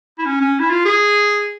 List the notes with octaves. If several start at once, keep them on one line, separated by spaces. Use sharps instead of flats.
E4
C#4
C#4
E4
F4
G#4